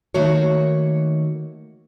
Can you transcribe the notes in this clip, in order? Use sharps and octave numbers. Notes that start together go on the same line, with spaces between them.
D#3 A3 A#3 F#4 C#5